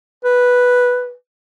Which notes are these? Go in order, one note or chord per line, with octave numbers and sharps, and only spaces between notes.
B4